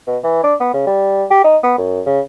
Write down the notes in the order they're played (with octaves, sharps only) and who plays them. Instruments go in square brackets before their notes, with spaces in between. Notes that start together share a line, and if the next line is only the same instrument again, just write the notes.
[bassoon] B2
E3
D4
B3
C#3
G3
G4
D#4
B3
F#2
C#3